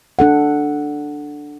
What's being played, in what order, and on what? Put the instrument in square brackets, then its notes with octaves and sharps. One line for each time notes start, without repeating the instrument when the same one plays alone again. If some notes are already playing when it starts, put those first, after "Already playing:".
[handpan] D4 A4 F#5